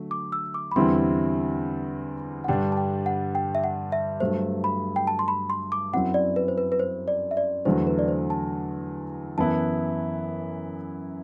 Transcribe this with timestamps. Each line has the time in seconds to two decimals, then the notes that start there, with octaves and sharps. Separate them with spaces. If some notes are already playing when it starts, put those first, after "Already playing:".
Already playing: D3 F#3 A3
0.11 D6
0.32 E6
0.54 D6
0.71 B5
0.76 E2 D3 G3 C4 E4 C6
2.44 F#5
2.48 G2 D3 G3 D4 G5
2.72 A5
2.77 G5
3.06 F#5
3.35 G5
3.55 E5
3.64 F#5
3.92 E5
4.20 G2 F#3 A3 C5
4.64 B5
4.96 G5
5.07 A5
5.19 C6
5.28 B5
5.50 C6
5.72 D6
5.93 F#2 F#3 C4 E4 F#5
6.14 D5
6.36 B4
6.48 C5
6.58 B4
6.72 B4
6.79 C5
7.08 D5
7.31 E5
7.37 D5
7.65 E2 D3 F#3 A3 C5
7.87 B4
7.99 D5
8.08 C5
8.30 A5
9.38 F#2 E3 B3 E4 A5